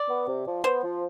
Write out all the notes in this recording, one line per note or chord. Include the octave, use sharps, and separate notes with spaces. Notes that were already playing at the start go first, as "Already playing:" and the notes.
Already playing: D5
B3
C3
F3
B3 C5
F3